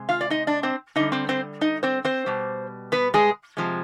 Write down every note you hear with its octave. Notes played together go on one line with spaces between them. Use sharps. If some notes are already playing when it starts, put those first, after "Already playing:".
Already playing: C3 G#3
F4 F5
D5
D#4 D#5
D4 D5
C4 C5
D3 G3 D#4 D#5
C4 C5
C4 C5
D#4 D#5
C4 C5
C4 C5
B2 G3
B3 B4
G#3 G#4
C3 F3 G#3